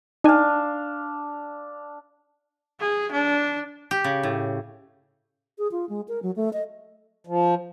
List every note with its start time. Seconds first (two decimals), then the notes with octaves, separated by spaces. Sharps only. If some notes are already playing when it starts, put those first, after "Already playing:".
0.24 D4 D#4 F5 G#5
2.81 G#4
3.12 D4
3.91 G4
4.04 C#3
4.23 A2
5.58 G#4
5.72 F4
5.89 G#3
6.08 A#4
6.23 F#3
6.36 A3
6.53 D#5
7.27 F3